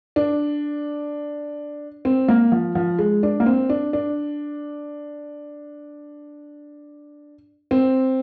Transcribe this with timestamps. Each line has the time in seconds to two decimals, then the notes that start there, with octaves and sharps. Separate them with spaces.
0.16 D4
2.05 C4
2.28 A#3
2.52 F3
2.75 F3
2.99 G#3
3.23 D4
3.40 A#3
3.46 C4
3.70 D4
3.93 D4
7.71 C4